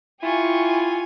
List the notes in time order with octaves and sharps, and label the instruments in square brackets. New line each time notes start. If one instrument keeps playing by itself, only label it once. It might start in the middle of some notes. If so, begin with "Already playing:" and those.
[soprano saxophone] E4 [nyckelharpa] F4 [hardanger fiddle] G4 C#6 [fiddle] G#5